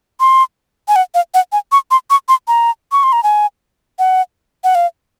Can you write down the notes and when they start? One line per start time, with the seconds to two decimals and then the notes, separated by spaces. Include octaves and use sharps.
0.20 C6
0.88 G#5
0.96 F#5
1.15 F5
1.34 F#5
1.52 G#5
1.72 C#6
1.91 C6
2.10 C#6
2.28 C6
2.48 A#5
2.92 C#6
3.03 C6
3.13 A#5
3.23 G#5
3.99 F#5
4.64 F#5
4.75 F5